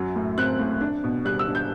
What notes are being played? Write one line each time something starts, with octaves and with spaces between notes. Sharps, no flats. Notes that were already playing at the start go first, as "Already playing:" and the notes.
Already playing: F#2 F#3
A2
C4 F#6
A2
D4
B2
G3 F#6
E6
D4
G6